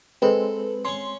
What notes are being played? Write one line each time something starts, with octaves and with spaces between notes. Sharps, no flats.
G#3 C4 A4 B4
C#4 C6 C#6